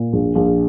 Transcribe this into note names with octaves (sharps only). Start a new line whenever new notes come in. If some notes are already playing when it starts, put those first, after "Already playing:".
Already playing: A#2
A#1
A#1